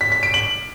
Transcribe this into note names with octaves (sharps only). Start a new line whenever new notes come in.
B6
B6
D7
F#7